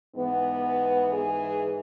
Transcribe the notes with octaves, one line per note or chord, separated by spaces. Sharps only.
G#2 E3 B3
G#4